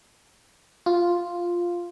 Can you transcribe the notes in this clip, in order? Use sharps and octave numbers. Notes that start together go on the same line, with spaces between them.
F4